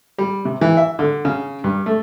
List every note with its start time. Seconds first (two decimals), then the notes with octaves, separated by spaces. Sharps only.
0.18 G3
0.45 C3
0.61 E3
0.77 E5
0.99 D3
1.25 C#3
1.64 G2
1.86 A3